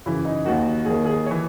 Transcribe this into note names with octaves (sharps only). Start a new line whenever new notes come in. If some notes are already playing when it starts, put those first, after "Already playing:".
F#2 C#3 E3 E4
D#4
D#2 D#3 F#4
D#2 D#3 G#4
G#4
E3 C#5